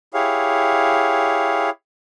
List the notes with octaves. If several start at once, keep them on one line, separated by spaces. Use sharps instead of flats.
E4 G4 G#4 C#5 F5